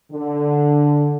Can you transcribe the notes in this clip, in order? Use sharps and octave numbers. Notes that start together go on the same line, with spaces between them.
D3